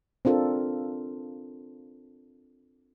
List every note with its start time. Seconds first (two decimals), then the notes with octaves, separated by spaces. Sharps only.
0.25 C4 D4 F4 A4 A#4